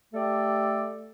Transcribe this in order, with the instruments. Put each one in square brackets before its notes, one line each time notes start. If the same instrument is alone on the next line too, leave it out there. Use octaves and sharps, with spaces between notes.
[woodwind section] A3 G4 A4 D5